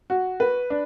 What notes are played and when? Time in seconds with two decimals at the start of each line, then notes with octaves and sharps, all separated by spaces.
0.10 F#4
0.40 B4
0.70 D4